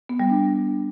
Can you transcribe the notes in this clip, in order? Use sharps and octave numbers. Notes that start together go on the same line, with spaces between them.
B3
G3
D4